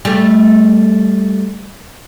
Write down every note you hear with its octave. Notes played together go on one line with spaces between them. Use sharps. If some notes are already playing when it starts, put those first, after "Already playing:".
G3 A3